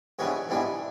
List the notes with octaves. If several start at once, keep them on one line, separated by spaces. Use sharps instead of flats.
G#2 E3 G3 B3 D4 C#5
G#2 E3 G3 B3 D4